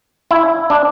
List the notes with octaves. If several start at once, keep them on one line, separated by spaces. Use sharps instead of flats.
E4
D4